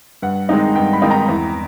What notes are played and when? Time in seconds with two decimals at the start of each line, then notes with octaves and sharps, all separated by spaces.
0.22 G2 F#5
0.49 D#3 G#3 C4 D#4
0.76 G2 G5
0.93 B5
1.02 D#3 G#3 C4 D#4
1.11 A#5
1.29 E2